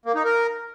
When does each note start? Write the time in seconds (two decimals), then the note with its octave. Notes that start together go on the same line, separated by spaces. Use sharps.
0.06 A#3
0.15 D#4
0.25 A#4